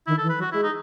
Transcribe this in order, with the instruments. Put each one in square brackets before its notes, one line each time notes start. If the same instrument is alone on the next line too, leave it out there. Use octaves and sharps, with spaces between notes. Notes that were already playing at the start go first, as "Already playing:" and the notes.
[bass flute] D#3 [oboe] E4
[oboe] A4
[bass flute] E3
[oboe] B4
[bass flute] F#3
[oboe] F#4
[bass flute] G#3 [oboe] E4
[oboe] D#4